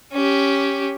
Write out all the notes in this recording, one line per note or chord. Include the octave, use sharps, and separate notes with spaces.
C#4 G4